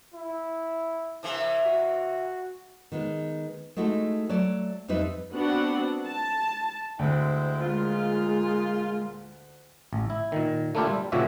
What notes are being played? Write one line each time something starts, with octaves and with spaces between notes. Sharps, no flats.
E4
C3 E3 A#3
F#4
D#3 G#3 B3
G#3 A3 D#4 E4 F#4
F#3 A3 C#5 D5
F2 G3 C4 D#4 B4 E5
B3 C4 D4 F#4 F#5
A5
D2 G#3 C4 E4
A#2 G#3 F4
A1
E4
A#2 D#3
A3 A#3 D4 E4 F4 G4
G3
A#2 C#3 F3 F#4 G4 E5